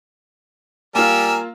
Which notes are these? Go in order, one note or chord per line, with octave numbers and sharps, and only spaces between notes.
G3 A#3 F4 A#4 G#5 E6